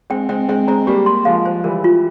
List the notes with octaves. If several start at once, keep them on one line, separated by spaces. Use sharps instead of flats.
G#3 C4 G5
G#3 C4 G5
G#3 C4 G5
G#3 C4 A#5
G3 A#3 G4
C6
F3 G#3 F5
C5
E3 G3 A#4
F4